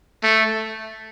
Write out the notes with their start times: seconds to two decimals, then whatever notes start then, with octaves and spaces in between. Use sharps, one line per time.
0.23 A3